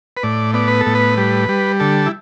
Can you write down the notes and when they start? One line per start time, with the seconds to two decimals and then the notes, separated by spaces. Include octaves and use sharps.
0.17 B4
0.23 A2 D5
0.54 B3 D5
0.68 B4
0.81 A4
0.86 A2
0.95 B4
1.17 G3
1.49 G3
1.80 D3 A4
2.06 E4